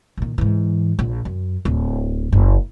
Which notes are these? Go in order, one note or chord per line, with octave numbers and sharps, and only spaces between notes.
A#2 D#3
G#2 E3
A#1
F#2
D1
F#1